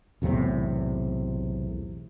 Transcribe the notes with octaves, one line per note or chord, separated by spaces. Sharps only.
B1 E2 A2 C3